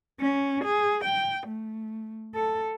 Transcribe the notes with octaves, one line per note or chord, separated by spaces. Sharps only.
C#4
G#4
G5
A3
A4